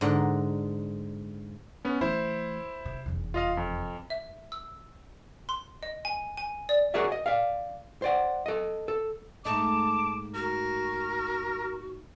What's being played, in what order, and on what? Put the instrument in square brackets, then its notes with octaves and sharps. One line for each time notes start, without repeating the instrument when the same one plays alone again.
[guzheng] G#2 D3 A#4 F#5
[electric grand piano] B3 C#4
[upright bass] E3 A3 [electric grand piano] E4 C5
[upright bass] C3
F1 E2
[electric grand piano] F4 D#5 F5
F2
[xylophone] E5
E6
C6
D#5
G#5
G#5
D5
[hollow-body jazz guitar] F#4 G#4 A#4 C#5 D5 E5
D#5
D5 F5
C5 D5 F#5
A4 D#5
A4
[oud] G#2 A3 D#4 [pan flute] A5 [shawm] D6
[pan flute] F#4 [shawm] A#4